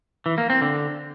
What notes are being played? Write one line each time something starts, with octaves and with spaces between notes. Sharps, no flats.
E3
A#3
C4
D3